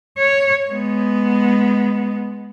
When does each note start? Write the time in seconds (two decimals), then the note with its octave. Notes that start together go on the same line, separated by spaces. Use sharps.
0.18 C#5
0.71 G#3 B3